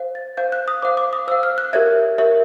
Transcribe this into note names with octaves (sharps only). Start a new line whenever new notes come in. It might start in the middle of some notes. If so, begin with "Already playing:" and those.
Already playing: C5 F5
A6
C5 F5 G6
F#6
D#6
C5 F5 D6
D6
D#6
C5 F5 E6
F6
F#6
G4 A#4 C#5 E5 G#6
G4 A#4 C#5 E5